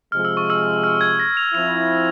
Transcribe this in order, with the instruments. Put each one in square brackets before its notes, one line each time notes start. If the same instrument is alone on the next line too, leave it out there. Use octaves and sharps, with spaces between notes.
[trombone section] C3 F3 G#3 [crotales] F6
[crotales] E6
C#6
E6
F6
G#6
A#6
F7
[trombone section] F3 C4 E4 [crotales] F7